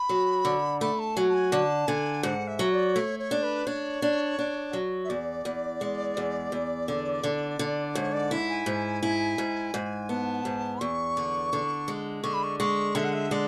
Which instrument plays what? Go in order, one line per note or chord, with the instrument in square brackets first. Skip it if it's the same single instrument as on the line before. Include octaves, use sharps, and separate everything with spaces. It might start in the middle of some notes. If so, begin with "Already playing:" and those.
Already playing: [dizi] B5
[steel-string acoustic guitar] F#3
D3
[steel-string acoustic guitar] A3 [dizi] B5
[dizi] A5
[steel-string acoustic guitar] F#3 [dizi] G#5
[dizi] A5
G#5
[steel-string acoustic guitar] D3 [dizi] A5
[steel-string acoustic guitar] D3 [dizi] G#5
[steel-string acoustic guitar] G#2 [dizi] F#5
[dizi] E5
[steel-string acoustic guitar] F#3
[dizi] D5
[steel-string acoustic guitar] A3 [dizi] C#5
[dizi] C#5
[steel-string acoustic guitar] D4
[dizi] B4
[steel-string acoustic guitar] D4 [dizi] C#5
[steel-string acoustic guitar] D4
D4
F#3
[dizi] E5
[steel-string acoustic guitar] E2 [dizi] D5
[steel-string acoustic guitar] E2
G#3
E2
E2
D3
D3
D3
[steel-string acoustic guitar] G#2 [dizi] C#5
[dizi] D5
[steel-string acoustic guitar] E4
[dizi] G#5
[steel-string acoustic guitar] G#2
E4
G#2
G#2
[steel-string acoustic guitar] B3 [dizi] A5
[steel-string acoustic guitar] G#2
[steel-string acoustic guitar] E2 [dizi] C#6
[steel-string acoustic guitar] D3
D3
G#3
[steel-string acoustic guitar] D3 [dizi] C#6
[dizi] B5
C#6
[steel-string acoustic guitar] G#3 [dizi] C#6
[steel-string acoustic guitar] D3 [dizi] E5
[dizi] F#5
E5
[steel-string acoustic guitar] G#3 [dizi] D5